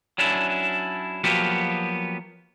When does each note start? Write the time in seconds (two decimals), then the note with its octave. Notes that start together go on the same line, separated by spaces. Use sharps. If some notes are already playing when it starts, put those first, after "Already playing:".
0.18 F#3 C#4 D4 E4
1.24 F3 F#3 A#3 B3 F#4 G4